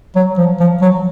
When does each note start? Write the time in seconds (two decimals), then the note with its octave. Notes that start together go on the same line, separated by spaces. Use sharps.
0.16 F#3
0.38 F3
0.60 F3
0.82 F#3